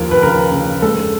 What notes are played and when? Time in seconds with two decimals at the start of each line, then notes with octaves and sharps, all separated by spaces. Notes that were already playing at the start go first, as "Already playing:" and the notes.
Already playing: D#2 F3 A#4
0.11 B4
0.23 C#3 A#4
0.52 C#3
0.82 G#3 A4